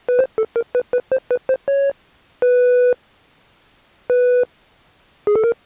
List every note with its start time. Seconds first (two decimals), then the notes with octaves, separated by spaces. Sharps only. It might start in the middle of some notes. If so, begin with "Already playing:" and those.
0.09 B4
0.19 C5
0.38 A4
0.56 A#4
0.75 B4
0.93 B4
1.12 C5
1.31 B4
1.49 C5
1.68 C#5
2.42 B4
4.10 B4
5.27 G#4
5.36 A4
5.44 A#4